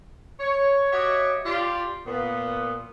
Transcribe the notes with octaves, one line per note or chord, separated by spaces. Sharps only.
C#5
F#4 G4 C#5 D#5 E5 F#5
F4 G4 D5
A#2 B3